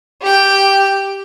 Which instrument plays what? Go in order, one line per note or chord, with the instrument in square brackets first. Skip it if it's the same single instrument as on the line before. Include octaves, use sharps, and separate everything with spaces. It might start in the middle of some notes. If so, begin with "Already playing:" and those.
[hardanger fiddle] G4 G5